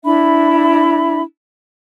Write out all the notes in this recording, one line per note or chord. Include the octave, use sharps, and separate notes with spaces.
D4 E4 E5 B5